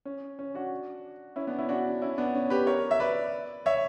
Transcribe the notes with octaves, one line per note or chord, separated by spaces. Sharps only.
C#4
C#4
D4 F#4
C#4 E4
B3 D4
C#4 E4
D4 F#4
C#4 E4
B3 D4
C#4
G4 B4
A#4 C#5
E5
B4 D5
C#5 E5